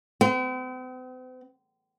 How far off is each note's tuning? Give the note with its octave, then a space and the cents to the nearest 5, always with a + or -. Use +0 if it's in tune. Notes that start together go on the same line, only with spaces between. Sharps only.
C4 -45